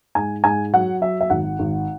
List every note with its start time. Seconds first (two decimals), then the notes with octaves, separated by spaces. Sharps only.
0.15 G#2 G#5
0.44 G#2 G#5
0.74 F#3 F#5
1.01 F#3 E5
1.21 E5
1.30 G#1 F#5
1.59 G#1